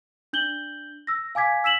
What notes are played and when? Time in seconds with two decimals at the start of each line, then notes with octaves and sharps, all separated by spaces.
0.33 D4 G6 F#7 G7
1.07 E6 A#6
1.35 F5 G#5 D6 G#6 B6
1.64 E6 B6 E7 F#7